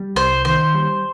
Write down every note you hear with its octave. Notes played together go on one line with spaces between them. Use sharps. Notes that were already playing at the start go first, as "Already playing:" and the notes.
Already playing: G3
C2 C5
D#3 C5
G3